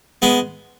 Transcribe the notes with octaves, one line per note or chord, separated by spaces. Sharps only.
G#3 B3